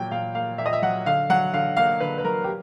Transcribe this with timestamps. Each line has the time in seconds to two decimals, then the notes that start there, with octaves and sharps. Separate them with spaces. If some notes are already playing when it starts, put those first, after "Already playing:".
Already playing: A#2 F#3 G5
0.11 A#2 F5
0.35 A#3 F5
0.58 A#2 E5
0.66 D#5
0.73 E5
0.82 F#3 F#5
1.06 D3 F5
1.30 F#3 F#5
1.53 D3 F5
1.77 A#3 F5
2.00 D3 B4
2.18 B4
2.24 F#3 A#4
2.44 G4